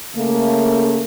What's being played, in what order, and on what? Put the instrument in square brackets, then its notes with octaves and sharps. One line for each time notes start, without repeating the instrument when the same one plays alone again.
[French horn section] C#3 A3 A#3